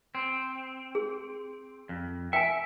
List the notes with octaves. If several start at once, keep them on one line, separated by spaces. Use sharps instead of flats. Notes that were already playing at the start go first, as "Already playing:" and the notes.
C4
G#4
F2
E5 G5 G#5